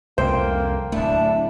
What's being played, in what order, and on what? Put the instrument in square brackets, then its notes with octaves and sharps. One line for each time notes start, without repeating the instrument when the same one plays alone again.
[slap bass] C2 F2 F3 [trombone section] A3 A#3 [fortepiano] C5 [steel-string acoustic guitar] G5
[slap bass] D1 A3 [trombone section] D4 [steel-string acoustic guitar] E4